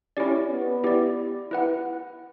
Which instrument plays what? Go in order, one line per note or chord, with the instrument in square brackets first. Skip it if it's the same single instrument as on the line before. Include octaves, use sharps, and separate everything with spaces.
[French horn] C#4 [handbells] E4 G4 D5
[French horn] B3
[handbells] E4 G4 D5
E4 B4 F#5